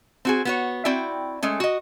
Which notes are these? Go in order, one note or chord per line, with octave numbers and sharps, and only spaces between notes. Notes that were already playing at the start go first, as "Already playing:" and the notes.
C4 F#4 G#4
B3 F#4 C#5
C4 E4 F#4 D5 G5
G#3 A3 C#4
F#4 D#5